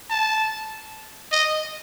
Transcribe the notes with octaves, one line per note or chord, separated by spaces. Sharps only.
A5
D#5